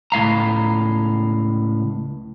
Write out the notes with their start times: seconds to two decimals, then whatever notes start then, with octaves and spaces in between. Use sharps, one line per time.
0.12 C#2 A2 F5 A#5